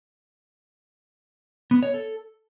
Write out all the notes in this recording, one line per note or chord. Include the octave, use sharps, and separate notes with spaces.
B3
C#5
A4